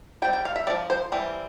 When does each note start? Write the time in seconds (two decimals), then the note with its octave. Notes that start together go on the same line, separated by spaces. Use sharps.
0.22 G3 C4 G5
0.33 G5
0.45 F5
0.56 E5
0.67 C4 D5
0.70 F3
0.90 C5
1.12 E3 G3 C4